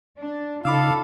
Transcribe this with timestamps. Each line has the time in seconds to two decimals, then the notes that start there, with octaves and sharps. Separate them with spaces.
0.18 D4
0.65 C#3 D#4 F4 A4 F5 B5 D6 E6